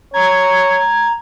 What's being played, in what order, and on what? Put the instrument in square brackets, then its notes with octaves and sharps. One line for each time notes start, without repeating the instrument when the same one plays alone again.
[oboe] C#5 [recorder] A#5 [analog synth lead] G#6